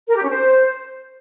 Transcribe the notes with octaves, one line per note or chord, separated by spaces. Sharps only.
A#4
G4
C#4
C5